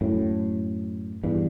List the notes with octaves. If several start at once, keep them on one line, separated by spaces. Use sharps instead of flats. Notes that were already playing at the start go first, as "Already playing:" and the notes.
F#2 A2
E2 G2